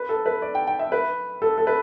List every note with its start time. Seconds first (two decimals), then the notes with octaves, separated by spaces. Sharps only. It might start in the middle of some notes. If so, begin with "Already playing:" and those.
Already playing: B4
0.09 A4
0.26 B4
0.42 D5
0.55 G5
0.67 G5
0.79 E5
0.92 B4
1.42 A4
1.58 A4
1.67 B4